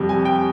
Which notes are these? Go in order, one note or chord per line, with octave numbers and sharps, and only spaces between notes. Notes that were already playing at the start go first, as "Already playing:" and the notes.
Already playing: F2 C3 G3
G#5
G5